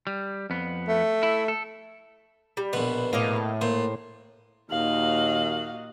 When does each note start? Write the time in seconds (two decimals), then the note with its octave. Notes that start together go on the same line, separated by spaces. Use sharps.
0.07 G3
0.50 F2 B3
0.88 A3
1.23 E4
1.48 A4
2.57 G3
2.73 A#1 B2 B4
3.13 A2 A#3 D#5 F5
3.61 A#2 C5
4.71 D#2 A#2 F#4 D#5 F5 F#7